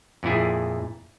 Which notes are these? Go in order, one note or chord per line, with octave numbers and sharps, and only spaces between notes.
F2 A#2 E4 G#4